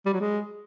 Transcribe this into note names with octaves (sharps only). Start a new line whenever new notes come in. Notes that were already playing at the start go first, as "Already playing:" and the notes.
G3
F#3
G#3